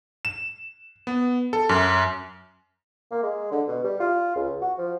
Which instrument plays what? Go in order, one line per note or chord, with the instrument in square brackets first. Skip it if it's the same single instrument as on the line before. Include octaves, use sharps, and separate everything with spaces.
[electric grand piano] E7
B3
A4
F#2
[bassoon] A#3
G#3
D3
B2
G3
F4
C#2
F#4
F3